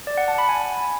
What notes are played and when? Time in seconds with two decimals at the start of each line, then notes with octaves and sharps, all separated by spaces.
0.07 D5
0.18 F#5
0.28 A5
0.38 B5
0.49 G#5